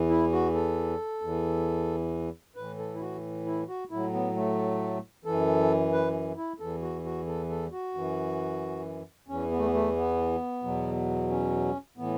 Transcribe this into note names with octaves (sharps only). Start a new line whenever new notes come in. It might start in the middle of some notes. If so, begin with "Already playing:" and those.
Already playing: E2 E3
E4
F#4
A4
E2 E3
A2 E3 B4
A4
E4
F#4
E4
F#4
A2 F#3 E4
B3
A3
F#2 E3 A4
B4
E4
E2 E3 A4
F#4
F#4
A4
A4
F#4
F#2 E3
E2 E3 C#4
B3
A3
B3
A3
B3
E2 B2 F#3
C#4
A2 E3 B3